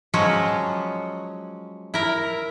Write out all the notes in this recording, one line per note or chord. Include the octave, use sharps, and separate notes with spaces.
F3 F#3 G#3 C#4 F4
E4 A#4